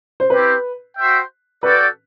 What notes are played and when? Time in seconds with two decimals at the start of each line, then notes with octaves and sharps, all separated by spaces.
0.20 C5
0.30 C4 E4 G4 B4
0.97 F#4 C5 E5 G5
1.63 F#4 A4 B4 D5 G5